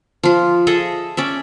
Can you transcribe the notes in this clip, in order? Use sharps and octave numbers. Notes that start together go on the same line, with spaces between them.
F3 F4
G#4 A4 D#5 E5
C#4 D5 E5